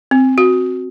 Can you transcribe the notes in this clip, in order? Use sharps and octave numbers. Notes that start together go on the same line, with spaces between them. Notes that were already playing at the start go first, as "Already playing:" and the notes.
C4
F#4